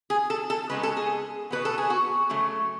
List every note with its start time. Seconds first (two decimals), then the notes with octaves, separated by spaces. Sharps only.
0.10 G#4
0.30 A4
0.50 A4
0.70 C#3 G#3 B3 B4
0.83 A4
0.97 G#4
1.50 B2 F#3 B3 B4
1.65 A4
1.78 G#4
1.90 F#4
2.30 C#3 F#3 A3